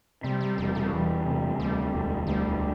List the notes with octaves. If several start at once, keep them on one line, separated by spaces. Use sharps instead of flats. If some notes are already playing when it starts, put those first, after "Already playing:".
C3 G3
G3
E1 G3
G3
F#3
E2 G3
C3
G#3
D2 G3
E1
D2 G3